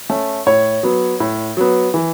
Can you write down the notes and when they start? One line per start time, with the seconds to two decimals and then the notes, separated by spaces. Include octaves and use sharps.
0.10 A3 C#4
0.46 A2 C#5
0.83 F#3 B3
1.20 A2
1.57 F#3 B3
1.94 E3